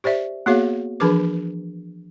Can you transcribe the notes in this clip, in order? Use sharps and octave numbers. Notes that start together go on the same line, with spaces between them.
G4 C5 D5 E5
A#3 B3 F#4 G#4 C#5 F5
E3 F3 D4 G#4 B4 D6